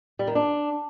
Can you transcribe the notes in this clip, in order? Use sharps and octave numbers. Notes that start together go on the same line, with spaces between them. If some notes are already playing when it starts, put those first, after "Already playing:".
G3
D#3
D4